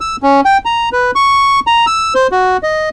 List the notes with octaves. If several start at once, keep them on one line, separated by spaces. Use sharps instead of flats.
E6
C#4
G5
A#5
B4
C#6
A#5
E6
C5
F#4
D#5